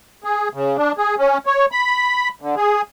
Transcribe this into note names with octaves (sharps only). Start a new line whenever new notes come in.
G#4
C#3
D4
G#4
C#4
C#5
B5
D3
G#4